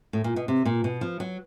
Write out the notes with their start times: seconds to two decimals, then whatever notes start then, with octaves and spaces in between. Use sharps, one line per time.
0.13 A2
0.24 A#2
0.36 B2
0.48 C3
0.65 A#2
0.84 B2
1.01 F3
1.20 F#3